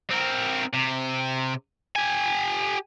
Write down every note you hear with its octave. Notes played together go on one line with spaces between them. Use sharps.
C4 A#4
C3
G4 G#5